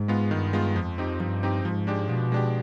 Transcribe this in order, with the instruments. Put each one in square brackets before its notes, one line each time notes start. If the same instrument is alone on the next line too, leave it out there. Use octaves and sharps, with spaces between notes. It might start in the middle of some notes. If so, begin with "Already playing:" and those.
Already playing: [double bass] G#2
[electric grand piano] G#3 B3 F4
[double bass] G2 [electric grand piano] D#3
[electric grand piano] G#3 B3 F4
[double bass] F2 [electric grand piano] F3
[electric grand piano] C4 D#4 G4
[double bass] G2 [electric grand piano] F3
[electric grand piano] C4 D#4 G4
[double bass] G#2 [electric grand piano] F3
[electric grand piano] G#3 D4 G4
[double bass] B2 [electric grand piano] F3
[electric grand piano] G#3 D4 G4